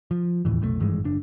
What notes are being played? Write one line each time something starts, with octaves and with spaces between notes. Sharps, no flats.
F3
F1 D#2 A2 E3
F1 B1 C3 A3
G#1 G2 E3 G#3
F#1 D4